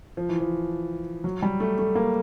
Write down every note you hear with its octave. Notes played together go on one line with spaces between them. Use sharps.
F3
E3
F3
F#3
G3
A3
A3
A#3